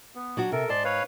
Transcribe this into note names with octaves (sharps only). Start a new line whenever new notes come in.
B3
F#3 D4 F#4
C3 A4 A#4
G#2 D5 A5 C6
B4 C#5 F5